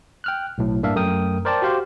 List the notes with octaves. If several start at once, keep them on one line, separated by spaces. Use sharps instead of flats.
G5 F6 F#6
B1 A2
G2 A#3 D4 E5 F5
F#2 A3 A#4 G5 D#6
A#4 C5 D5 G5 A5
F#4 G4 C5 F5